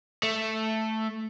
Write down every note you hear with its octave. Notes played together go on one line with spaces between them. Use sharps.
A3